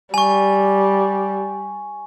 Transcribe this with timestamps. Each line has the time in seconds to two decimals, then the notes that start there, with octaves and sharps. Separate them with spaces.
0.14 G3 G#5 C#6